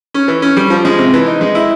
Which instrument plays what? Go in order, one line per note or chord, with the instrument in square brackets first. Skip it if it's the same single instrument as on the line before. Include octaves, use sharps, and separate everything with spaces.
[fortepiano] C#4
E3
C#4
G3
F3
G#3
C3
E3
D#4
G#3
E4